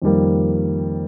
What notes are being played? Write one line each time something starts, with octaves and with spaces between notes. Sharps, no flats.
F2 D#3 G3 A#3